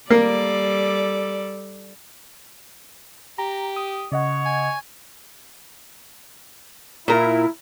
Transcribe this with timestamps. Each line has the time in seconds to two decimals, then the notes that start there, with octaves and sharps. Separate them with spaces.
0.10 G3 A#3 A4 D5
3.38 G4 A#5
3.76 D#6
4.12 C#3 C#5 D#5 F#5
4.45 G#5
7.08 A#2 E4 A#4